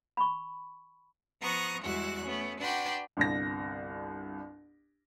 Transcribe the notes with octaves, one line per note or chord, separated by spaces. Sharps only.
B5 C#6
F3 B3 A#5 C#6 D#6 F#6
E2 G3 G#3 E4 F#4 F#6
A3 B3 C#4
D4 F#4 B4 D5 G5 C6
G1 C2 A#6